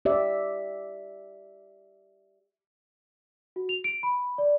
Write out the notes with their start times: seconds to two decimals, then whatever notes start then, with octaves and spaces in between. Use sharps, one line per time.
0.05 G4 D5 E5
3.56 F#4
3.69 F7
3.84 D7
4.03 B5
4.38 D5